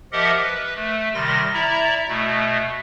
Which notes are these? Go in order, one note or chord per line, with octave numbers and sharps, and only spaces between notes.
F3 G4 A#4 D#5 E5 F#5
B4
A3
C3 D#3 G3 C6 A#6
E4 D5 E5 A#5
B2 A3